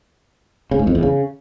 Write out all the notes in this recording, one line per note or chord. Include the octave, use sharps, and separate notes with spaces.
C#3
G#2
F2
E2
C#3